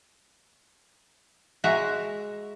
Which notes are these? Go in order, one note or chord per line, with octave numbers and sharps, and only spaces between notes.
G#3 F#4 E5 A#5